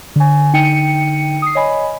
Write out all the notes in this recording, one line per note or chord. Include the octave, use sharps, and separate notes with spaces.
D3 G#5
D3 D#4 G5 C#7 D#7
D#6 C7
C#5 D#5 G#5 B5